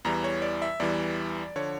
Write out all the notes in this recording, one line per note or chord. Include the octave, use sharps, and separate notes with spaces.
E2 E3 G3 A#5
C#5
D5
E5
E2 E3 G3 D5
D3 F3 C#5